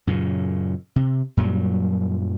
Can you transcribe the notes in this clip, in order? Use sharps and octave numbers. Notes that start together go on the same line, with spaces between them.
F#2 A#2 C#3
C3
F#2 A#2 F#3 G3